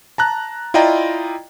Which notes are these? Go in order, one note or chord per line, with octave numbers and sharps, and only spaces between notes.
A5 A#5 F#6
E4 F4 D5 D#5 G5 A#5